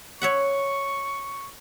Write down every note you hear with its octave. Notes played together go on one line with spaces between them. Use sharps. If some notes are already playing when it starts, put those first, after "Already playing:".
C#5 E5 F#5 C#6